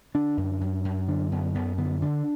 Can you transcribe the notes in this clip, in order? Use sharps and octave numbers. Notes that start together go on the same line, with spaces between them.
D3 D4
F#2
F#2
F#2
D3 D4
F#2 B3
F#2 B3
D3 B3
D3 D4